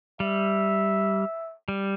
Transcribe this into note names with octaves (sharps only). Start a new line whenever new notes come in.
G3 E5
G3